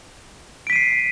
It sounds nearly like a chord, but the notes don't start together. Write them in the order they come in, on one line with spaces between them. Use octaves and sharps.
D7 B6 D#7 C7